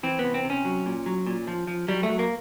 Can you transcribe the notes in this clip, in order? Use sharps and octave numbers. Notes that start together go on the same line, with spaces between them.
E3 C4
B3
C3
C4
C3
C#4
F#3
A#2
F#3
A#2
F3
F3
F#3 G3
A3
F#3
A#3